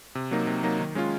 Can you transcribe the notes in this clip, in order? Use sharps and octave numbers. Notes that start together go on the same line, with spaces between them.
C3
F#3 A#3 D#4
C3
F#3 A#3 D#4
D#3
G#3 C#4 F4